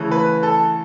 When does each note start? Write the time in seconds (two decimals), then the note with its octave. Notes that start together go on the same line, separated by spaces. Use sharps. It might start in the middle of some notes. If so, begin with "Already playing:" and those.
Already playing: C#3 E3 A3
0.11 B4
0.43 A4